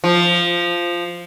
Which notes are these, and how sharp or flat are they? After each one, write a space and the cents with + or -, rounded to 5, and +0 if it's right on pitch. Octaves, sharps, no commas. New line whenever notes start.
F3 -5